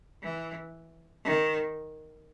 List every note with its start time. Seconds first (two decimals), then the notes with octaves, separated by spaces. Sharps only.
0.23 E3
1.25 D#3